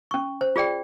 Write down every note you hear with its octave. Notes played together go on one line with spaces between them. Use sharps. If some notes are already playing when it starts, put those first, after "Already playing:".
C#4 C#6
C5
F4 G#4 D5 G5